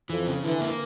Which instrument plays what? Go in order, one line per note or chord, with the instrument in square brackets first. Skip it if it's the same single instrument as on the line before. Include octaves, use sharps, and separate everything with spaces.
[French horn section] F2 [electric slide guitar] E3
[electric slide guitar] C#3
[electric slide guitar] D3 [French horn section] E3
[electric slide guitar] A#3